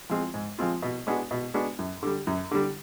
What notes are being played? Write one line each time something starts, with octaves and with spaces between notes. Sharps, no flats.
F3 G#3 C4 F4
G#2
F3 G#3 C4 F4
B2
G#3 B3 D4 F#4
B2
G#3 B3 D4 F#4
F#2
D3 G3
F#2
D3 G3